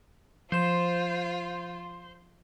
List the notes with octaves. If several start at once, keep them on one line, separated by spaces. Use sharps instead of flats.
F3 F4 C5 E7